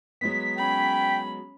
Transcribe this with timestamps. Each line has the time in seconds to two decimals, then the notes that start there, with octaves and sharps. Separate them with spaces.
0.21 F#3 G#3 B3 B6
0.58 C#4 G5 B5